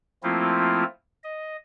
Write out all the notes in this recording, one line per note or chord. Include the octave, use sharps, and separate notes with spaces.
F3 A3 A#3 C4 E4 F4
D#5